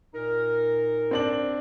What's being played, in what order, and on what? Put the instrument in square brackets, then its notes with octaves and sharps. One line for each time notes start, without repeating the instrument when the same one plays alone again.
[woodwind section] A#2 D#4 A#4
[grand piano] C4 D4 F#7